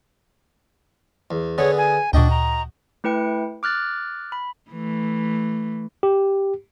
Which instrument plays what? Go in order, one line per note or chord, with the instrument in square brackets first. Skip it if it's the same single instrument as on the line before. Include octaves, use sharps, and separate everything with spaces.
[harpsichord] E2
[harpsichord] D3 B3 G#4 [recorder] C#5
[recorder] G#5
[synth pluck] D2 A#2 [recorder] D4 [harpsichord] F#4 D#5 G5
[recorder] A#5
[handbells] A3 E4 B4 G5 C#7
D6 F6 F#6 A6
B5
[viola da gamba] E3 A3
[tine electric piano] G4